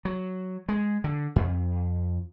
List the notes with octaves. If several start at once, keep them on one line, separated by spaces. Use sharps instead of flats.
F#3
G#3
D3
F2